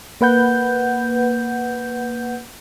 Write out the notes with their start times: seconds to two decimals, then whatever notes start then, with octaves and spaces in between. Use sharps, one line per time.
0.21 A#3 B4 F#5 G6